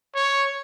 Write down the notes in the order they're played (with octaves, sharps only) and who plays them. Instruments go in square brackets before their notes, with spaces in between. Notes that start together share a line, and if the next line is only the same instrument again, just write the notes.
[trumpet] C#5